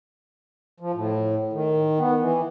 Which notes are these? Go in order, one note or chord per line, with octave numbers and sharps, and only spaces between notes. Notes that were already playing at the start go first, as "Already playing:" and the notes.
F3
A2
D#3
B3
E3